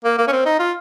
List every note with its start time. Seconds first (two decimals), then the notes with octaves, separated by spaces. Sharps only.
0.04 A#3
0.18 A#3
0.28 C#4
0.32 C4
0.45 D#4
0.59 F4